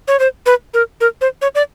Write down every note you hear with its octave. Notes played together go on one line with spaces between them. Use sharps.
C#5
C5
B4
A#4
A#4
C5
C#5
D5